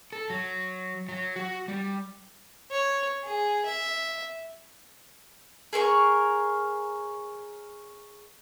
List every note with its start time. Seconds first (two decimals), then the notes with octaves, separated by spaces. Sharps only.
0.12 A4
0.30 F#3
1.09 F#3
1.36 F#4
1.68 G3
2.71 C#5
3.24 G#4
3.65 E5
5.73 G#4 A#4 C#5 C#6